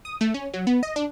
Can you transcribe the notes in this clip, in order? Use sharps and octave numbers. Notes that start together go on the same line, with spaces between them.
D#6
A3
C#4
F#3
B3
D#5
D4